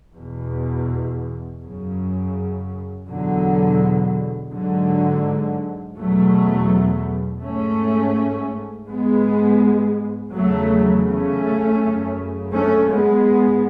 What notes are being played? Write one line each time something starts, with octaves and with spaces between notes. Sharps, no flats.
E2 B2
F#2 C#3
E2 B2 D3 F#3
G#2 D3 F#3
E2 B2 F#3 A3
G#2 A3 C#4
G#2 G#3 B3
E2 C#3 F#3 A3
A3 C#4
F#2 C#3
A3 C#4
G#3 B3
G#2